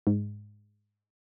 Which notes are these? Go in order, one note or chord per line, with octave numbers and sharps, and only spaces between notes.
G#2